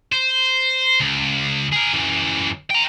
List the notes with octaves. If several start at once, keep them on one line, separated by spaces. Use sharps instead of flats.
C5
C#2
G#4 A#4
F#2 E3
G5 A#5